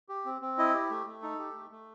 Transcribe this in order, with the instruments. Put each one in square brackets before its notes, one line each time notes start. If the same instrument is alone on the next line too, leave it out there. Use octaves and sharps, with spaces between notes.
[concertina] G4
C4
C4
E4 D#5
G4
A3
A3
D#4 A4
G4
A3
A3